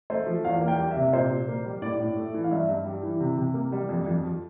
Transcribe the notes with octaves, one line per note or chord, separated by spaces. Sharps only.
A3 C5
F3
E2 F5
A#3
G5
G3
E5
C3
A#2 C5
A#2
A#3
G3
A2 D5
A2
A3
E3
F5
G2 E5
G2
G3
E3
C3
C3
A#3
G3
F2
F2
F3